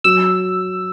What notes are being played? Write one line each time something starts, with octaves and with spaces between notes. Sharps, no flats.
F#3 E6